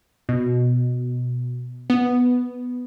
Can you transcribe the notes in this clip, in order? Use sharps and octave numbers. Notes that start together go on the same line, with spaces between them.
B2
B3